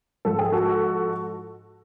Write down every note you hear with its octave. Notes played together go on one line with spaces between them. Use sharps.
G#2 F3 A4
G#4
F#4 A4